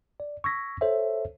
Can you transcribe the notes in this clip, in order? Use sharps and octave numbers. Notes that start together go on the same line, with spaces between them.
D5
C#6 E6 G#6 A#6 B6
A4 C5 C#5 E5